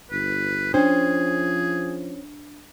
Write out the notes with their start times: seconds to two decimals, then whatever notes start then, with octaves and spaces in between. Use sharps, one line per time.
0.11 G1 B4
0.74 F3 C#4 D4 G#4 C5